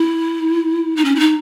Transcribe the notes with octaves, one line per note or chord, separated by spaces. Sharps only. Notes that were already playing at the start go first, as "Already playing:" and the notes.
Already playing: E4
D#4
C#4
E4
D#4